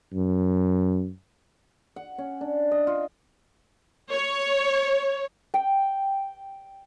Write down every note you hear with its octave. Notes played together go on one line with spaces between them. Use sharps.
F#2
F#5
C#4
D4
D#5
F4
C#5
G5